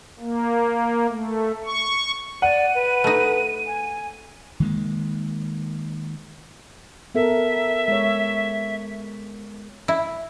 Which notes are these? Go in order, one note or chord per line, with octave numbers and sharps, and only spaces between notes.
A#3
A3
C#6
D5 F#5 D#7
B4
A3 D#4
G#5
D#3 G#3 A#3
B3 A4 A#4 E5
G#3 C#5
E4